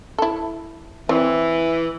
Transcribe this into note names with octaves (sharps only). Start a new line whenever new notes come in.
E4 A4
E3 C4 D5